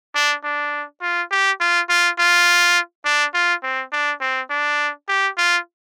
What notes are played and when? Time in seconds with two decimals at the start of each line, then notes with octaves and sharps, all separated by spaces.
0.15 D4
0.44 D4
1.02 F4
1.31 G4
1.60 F4
1.89 F4
2.18 F4
3.05 D4
3.34 F4
3.63 C4
3.92 D4
4.21 C4
4.50 D4
5.08 G4
5.37 F4